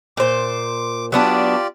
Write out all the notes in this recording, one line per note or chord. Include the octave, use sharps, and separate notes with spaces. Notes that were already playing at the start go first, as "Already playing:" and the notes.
A#2 C5 D6
F#3 B3 D4 F4 G4 D5